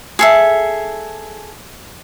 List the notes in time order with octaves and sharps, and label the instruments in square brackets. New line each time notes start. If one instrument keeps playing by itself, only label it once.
[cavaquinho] G#4 A4 E5